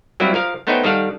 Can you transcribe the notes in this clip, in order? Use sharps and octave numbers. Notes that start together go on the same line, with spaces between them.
F#3 G3 A#3 C4 E4
F3 A#4 F5
A3 B3 D#4 C5 C#5 G5
D#3 G3 A4 F5 F#5